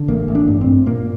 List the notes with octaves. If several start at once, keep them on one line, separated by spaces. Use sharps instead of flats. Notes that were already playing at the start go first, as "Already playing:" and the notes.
Already playing: D3
A1 A#3
A1
D4
G2
C4
G2
A#2 A#3